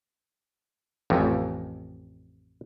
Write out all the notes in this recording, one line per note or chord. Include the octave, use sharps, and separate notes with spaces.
A1 F2